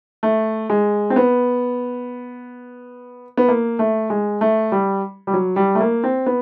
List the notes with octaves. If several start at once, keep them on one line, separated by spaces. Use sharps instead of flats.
A3
G#3
C4
B3
B3
A#3
A3
G#3
A3
G3
G3
F#3
G3
A3
A#3
C4
B3